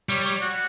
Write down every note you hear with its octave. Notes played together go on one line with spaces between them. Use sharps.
G3 C#5
C#5
F#4